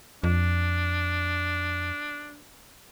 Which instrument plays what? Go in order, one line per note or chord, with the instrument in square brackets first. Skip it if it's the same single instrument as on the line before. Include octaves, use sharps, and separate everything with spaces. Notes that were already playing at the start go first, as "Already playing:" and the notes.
[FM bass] F2 [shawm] D4